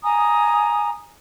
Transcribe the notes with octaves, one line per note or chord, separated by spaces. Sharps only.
G#5 A#5 D#6